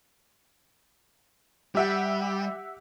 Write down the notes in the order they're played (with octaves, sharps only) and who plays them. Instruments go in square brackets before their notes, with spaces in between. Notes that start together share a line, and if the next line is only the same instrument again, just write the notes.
[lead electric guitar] G3 [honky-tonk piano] G4 E5 F#5